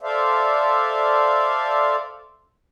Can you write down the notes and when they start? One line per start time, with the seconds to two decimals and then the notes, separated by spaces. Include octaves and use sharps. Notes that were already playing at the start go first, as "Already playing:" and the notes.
0.01 A4 C5 D5 E5 F5